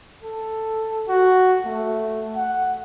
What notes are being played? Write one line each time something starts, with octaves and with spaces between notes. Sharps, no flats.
A4
F#4
A3
F#5